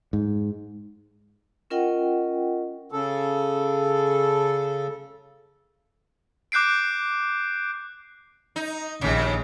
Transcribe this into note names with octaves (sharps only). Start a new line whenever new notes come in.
G#2
C#4 F4 A#4 D#5 F#5 G5
C#3 A4
D6 F#6 G6 C7 D7
D#4
A#1 D#2 C#3